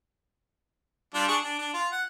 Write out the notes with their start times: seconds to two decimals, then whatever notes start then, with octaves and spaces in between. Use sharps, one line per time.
1.14 G3 D4 F4
1.28 D4 G#4 C#6
1.43 D4
1.58 D4
1.73 F4
1.92 F#5